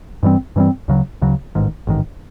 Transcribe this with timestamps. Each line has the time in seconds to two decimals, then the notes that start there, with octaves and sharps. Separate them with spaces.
0.23 G2 E3 G3 C4
0.56 G2 E3 G3 C4
0.88 D2 C#3 F#3
1.22 D2 C#3 F#3
1.55 A1 G#2 D#3
1.87 A1 G#2 D#3